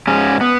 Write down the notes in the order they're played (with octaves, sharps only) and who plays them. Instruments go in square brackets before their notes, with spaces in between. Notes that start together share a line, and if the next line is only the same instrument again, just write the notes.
[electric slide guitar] G#2 C#4
B3